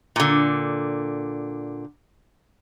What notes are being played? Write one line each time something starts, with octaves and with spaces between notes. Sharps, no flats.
A#2 D3